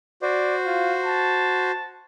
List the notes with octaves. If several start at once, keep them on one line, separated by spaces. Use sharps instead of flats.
F#4 C5 D5
F4
A5